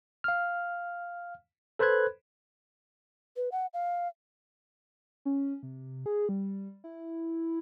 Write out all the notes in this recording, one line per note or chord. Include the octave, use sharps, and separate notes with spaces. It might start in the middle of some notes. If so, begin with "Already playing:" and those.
F5 F6
A4 B4 C5 B5 F#6 G#6
B4
F#5
F5
C#4
C3
G#4
G3
E4